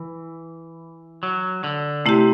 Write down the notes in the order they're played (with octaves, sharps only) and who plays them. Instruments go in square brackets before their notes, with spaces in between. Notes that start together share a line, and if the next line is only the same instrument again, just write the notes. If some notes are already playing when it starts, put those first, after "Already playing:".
Already playing: [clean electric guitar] E3
F#3
D3
[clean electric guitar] C3 [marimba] A3 E4 G4